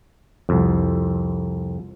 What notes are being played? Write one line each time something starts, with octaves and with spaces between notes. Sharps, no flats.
C2 F2